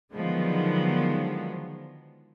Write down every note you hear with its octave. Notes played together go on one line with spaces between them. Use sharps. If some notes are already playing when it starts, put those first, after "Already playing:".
D3 D#3 F3 F#3 G#3 B3